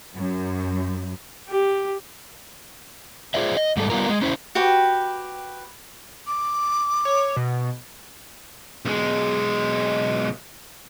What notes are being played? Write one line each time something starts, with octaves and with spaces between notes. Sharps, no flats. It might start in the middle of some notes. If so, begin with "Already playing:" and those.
F#2
G4
F4 G#4 C5 D5 E5
D#5
G#2 G3 A3 A4
G3 B3 F4 A#4
G#3
C#4 E4 C5
F#4 G4 B4 G5
D6
C#5
B2
B1 G#3